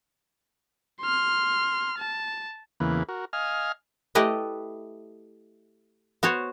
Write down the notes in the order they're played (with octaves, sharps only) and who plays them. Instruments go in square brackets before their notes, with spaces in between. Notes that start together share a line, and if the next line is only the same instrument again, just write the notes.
[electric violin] C6 F6
A5
[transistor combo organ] E2 C#3 E3 A#3 B4
F#4 A#4
D#5 F5 G#5 F6
[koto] A3 E4 G4 B4 D#5
B3 F#4 C5 C#5